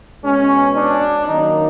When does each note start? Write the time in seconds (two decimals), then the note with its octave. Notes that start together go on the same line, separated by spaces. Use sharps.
0.24 B2 G#3 B3 C#4
0.76 D4
1.28 F#2 D#3 F#3 A#3 D#4